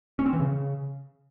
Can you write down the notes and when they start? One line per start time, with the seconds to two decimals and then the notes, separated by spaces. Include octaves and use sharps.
0.19 C#4
0.26 C4
0.33 E3
0.39 C#3